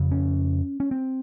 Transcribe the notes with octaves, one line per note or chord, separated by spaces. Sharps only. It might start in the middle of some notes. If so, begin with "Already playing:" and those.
Already playing: F2 C#3
C#4
C#4
C4